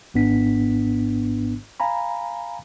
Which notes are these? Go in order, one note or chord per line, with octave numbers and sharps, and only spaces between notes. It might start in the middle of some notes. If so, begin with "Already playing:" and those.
G#1 G#2 B3 D4 B6
F5 G#5 A#5 B5